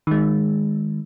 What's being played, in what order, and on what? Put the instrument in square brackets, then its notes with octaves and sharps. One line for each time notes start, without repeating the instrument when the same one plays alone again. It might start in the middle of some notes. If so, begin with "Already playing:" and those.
[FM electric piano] D#3 G#3